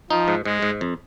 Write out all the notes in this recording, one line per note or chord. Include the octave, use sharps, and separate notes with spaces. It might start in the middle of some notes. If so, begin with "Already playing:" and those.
F3 D#4
G#2
G#2 G#3
G#2
F2